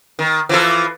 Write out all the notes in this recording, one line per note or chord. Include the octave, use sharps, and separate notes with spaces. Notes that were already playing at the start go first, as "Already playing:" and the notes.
D#3
E3 F3 A4